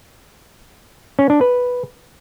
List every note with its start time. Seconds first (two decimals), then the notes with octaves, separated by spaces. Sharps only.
1.19 C#4
1.30 D4
1.41 B4